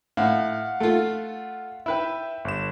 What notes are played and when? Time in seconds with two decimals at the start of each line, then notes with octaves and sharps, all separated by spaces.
0.17 A2 F5 F#5
0.80 A3 F4
1.86 E4 B4 E5 G5
2.45 G1 E7